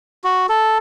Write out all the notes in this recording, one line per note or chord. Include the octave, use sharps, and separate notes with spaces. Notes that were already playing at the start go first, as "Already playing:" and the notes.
F#4
A4